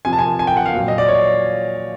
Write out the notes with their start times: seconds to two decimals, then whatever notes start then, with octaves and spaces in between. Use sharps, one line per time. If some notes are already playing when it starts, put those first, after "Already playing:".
0.05 C3 F3 G#5
0.13 A5
0.19 G#5
0.39 G#5
0.47 G5
0.57 F#5
0.66 F5
0.73 A#2 F#3
0.88 D#5
0.98 D5
1.08 C#5